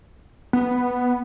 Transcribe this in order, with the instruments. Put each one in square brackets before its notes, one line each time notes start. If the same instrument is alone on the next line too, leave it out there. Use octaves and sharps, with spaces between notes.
[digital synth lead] B3